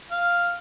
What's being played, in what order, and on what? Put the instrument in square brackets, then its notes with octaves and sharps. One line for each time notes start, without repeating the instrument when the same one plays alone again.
[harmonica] F5